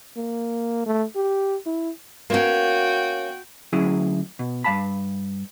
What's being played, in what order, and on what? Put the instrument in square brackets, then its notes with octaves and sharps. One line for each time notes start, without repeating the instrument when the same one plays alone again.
[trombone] A#3
A3
G4
E4
[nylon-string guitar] A#3 C#4 [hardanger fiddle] F#4 G5
[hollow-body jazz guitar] D2 F#3 C#4 E4 G#4
B2
G2 F5 A5 B5